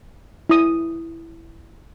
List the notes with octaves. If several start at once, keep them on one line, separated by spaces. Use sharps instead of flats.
E4 D#6